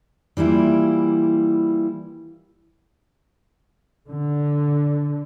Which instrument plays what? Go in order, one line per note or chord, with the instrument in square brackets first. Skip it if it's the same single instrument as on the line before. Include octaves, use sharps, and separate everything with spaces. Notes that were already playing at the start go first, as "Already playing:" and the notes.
[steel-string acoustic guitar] E3 G3 A#3 E4 F4
[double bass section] D3